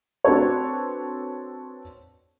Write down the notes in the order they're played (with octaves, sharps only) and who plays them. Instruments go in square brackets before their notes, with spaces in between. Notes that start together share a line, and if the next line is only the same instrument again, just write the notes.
[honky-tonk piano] C4 D4 F#4 A4 B4 C#5